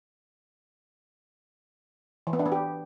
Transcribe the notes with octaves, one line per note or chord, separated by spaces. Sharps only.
E3
B3
D4
B3
G4